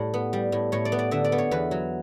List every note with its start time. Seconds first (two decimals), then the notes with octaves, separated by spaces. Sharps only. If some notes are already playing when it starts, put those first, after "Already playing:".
Already playing: A2 G3
0.14 B3
0.33 G3
0.52 A2
0.72 A2 C#5
0.85 D5
0.92 B3
0.99 D5
1.11 D3 E5
1.24 D5
1.32 B3
1.38 C#5
1.51 E2 B4
1.71 F#3